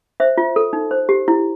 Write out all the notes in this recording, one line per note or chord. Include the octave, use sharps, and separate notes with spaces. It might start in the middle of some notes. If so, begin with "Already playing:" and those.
C5 E5
F4
A4
D#4
C5
G4
E4